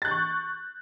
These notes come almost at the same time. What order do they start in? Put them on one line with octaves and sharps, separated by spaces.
A6 F#6 G6 C#6